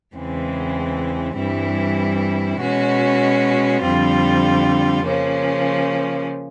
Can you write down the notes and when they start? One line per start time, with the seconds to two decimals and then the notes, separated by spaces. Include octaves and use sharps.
0.16 E2 C#3 E3 G#3 C4
1.37 G2 E3 G3 C4 E4
2.60 B2 G#3 C#4 F#4
3.82 F2 D3 G3 C4 F4
5.04 C#3 F3 A#3 C#4